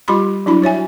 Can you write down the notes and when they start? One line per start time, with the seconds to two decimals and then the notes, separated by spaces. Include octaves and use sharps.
0.08 G3 F4 G4 B5 C6
0.46 F#3 D4 E4 F#4 B5
0.62 F#4 C#5 E5 G#5